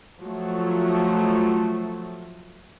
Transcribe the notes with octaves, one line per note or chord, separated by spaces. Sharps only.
F3 F#3 A3